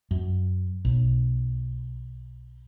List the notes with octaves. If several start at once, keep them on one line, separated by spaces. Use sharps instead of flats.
F#2
B1